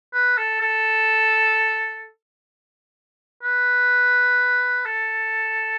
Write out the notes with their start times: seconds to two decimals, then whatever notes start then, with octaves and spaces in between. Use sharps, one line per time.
0.14 B4
0.38 A4
0.62 A4
3.43 B4
4.86 A4